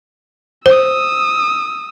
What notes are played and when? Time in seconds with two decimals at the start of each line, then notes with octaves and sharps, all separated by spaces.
0.66 C5 D#6 E6